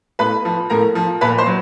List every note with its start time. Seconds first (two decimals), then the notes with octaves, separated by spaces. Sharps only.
0.19 A2 B4 B5
0.45 F3
0.70 A2 A#4 A#5
0.95 F3
1.21 A#2 B4 B5
1.38 C5 C6
1.46 F#3